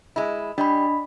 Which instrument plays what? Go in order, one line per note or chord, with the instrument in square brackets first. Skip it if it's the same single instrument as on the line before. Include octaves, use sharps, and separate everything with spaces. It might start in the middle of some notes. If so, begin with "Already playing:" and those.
[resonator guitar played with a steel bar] G#3 E4
[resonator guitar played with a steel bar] G3 [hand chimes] D4 D#5 B5